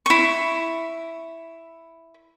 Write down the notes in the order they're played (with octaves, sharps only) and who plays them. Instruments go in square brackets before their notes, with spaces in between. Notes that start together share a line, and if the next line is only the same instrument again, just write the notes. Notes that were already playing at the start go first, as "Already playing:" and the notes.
[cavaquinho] E4 C#6